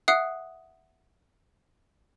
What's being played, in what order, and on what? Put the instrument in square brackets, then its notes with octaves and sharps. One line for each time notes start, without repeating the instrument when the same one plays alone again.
[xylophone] E5 F#5 D#6 F#6 C7